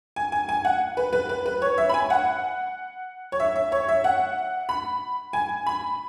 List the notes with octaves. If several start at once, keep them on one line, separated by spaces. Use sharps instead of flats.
G#5
G#5
G#5
F#5
B4
B4
B4
B4
C#5
E5
B5
G#5
F#5
C#5
E5
E5
C#5
E5
F#5
B5
G#5
B5